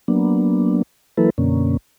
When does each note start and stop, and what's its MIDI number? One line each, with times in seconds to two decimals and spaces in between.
0.08 0.82 54
0.08 0.82 58
0.08 0.82 59
0.08 0.82 62
1.17 1.30 52
1.17 1.30 54
1.17 1.30 58
1.17 1.30 64
1.17 1.30 69
1.17 1.30 71
1.38 1.77 42
1.38 1.77 47
1.38 1.77 50
1.38 1.77 58
1.38 1.77 61